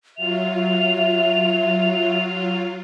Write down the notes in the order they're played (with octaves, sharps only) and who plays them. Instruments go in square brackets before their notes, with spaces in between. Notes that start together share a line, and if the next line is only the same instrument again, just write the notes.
[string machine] F#3 F4 [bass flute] E5 [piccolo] F7